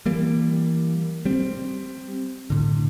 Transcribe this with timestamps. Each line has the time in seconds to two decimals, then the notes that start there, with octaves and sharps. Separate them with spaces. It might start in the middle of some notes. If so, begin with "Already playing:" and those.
0.06 E3 G3 A#3
1.25 G3 C4
2.50 A2 D3